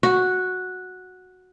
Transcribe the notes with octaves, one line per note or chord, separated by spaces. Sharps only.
F#4